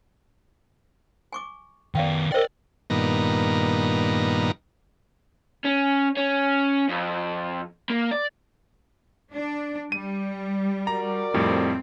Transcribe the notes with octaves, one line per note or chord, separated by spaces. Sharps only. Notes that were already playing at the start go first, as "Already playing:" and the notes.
G#5 C#6 D6
D#3 B3 D5 F5 G5
A#4 C5 D5 D#5 G5
G2 A#2 D#3 B3 A#5
C#4
C#4
F2
A#3
D5
D4
G3 D#7
F#4 A#4 D5 A#5
F2 A2 G3 C4